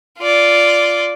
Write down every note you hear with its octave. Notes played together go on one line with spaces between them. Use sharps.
F4 D5